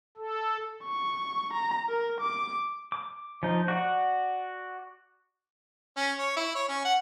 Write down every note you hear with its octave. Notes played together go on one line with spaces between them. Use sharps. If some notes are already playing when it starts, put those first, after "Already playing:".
A4
C#6
A#5
A#4
D6
D6
F3 D#4
F#4 D5 F#5
C#4
C#5
E4
C#5
C#4
F#5